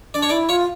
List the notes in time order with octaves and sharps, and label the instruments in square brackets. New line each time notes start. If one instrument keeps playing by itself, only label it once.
[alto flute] D4 [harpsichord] D5
[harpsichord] C#5
[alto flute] E4 [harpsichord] D5
[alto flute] F4 [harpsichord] C#5